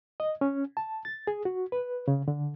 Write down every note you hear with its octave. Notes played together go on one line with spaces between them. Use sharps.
D#5
C#4
A5
A6
G#4
F#4
B4
C#3
D3